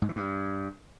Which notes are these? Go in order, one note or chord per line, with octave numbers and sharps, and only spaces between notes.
G#2
E3
G2